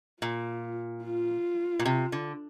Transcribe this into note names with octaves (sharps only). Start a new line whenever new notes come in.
A#2 F4
F4
A#2
C3
D3